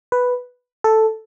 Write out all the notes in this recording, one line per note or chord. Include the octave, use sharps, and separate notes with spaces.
B4
A4